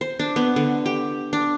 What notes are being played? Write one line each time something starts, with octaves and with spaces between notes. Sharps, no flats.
C5
D4
B3
D3
G4
D4